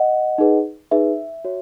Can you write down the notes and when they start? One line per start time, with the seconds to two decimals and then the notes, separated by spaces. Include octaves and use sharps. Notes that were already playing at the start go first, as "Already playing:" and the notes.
Already playing: D#5 F#5
0.38 D#4 G#4 B4
0.91 D#4 G#4 B4 E5
1.44 F#4 C#5